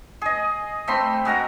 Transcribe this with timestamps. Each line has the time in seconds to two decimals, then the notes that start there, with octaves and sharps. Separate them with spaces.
0.22 G#4 D#5
0.88 A3 C4 B5 C6
1.25 G#3 F#4 A#4 A#5